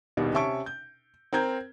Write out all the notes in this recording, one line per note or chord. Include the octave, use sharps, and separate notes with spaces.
A#1 D#2 B2 D#3 G3
C3 C#4 E5 A5 C#6 D7
G6
C4 A#4 A#5 G6 G#6